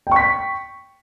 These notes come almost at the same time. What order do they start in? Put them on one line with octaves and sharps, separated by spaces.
G5 C#6 B6